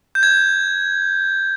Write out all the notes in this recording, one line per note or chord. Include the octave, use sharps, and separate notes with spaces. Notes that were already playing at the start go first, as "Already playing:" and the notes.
G6
G#6